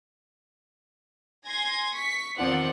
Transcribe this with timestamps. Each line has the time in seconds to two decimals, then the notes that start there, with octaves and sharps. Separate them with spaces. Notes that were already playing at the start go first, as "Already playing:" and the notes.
1.47 G#5 C6 G#6 A#6
1.93 C#6 B6
2.36 E2 D#3 F3 C4 D5 F#5